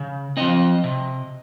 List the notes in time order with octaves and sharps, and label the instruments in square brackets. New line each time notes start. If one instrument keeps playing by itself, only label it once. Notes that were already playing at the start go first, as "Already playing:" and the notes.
Already playing: [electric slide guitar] C#3
F3 C4 D#5
C3